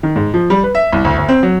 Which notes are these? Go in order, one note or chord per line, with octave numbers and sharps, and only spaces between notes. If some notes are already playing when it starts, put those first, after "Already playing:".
D#3
G#2
F3
G3
B4
E5
C2
D2
D2
C4
F#3